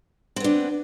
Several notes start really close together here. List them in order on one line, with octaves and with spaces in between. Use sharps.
C4 B3 D4